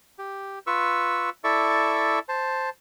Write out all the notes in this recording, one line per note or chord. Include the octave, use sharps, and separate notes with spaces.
G4
F4 B4 C#6 E6
E4 A4 D5 E5 C#6
C5 A5